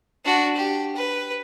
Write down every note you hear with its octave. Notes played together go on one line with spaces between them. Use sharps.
D4 F#4
G4
B4